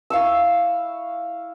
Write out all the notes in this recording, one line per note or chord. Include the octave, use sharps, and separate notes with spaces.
E4 F5 C#6 E6